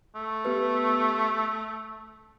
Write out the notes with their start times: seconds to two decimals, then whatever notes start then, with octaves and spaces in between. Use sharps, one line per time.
0.15 A3
0.45 B3 G4 B4
0.89 E6